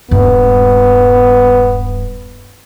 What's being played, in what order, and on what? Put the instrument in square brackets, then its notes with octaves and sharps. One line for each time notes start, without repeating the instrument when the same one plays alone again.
[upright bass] D#1 G2 [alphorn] B3